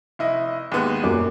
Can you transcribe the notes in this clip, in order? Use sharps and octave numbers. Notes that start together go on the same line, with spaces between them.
F1 E4 D#5
D#2 G#2 B3
F#2 A#2 D6